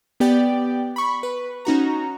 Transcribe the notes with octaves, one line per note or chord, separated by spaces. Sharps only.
B3 G4 D5 G5
B5 C#6
B4
C#4 D#4 F#4 A#5